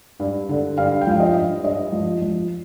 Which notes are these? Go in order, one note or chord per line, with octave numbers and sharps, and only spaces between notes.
G2
D3
G2 F5
G5
F3 F5
D#5
G2
G2 D#5
F3
F3